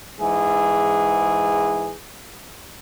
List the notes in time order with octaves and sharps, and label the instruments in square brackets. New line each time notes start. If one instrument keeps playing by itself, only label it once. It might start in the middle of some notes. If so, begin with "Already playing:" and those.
[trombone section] G#2 E3 G#4